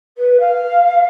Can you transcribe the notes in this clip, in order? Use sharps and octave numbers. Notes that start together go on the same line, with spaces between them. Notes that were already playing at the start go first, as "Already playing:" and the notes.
B4
F5